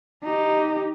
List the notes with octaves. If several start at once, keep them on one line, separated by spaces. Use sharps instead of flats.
D#4 G4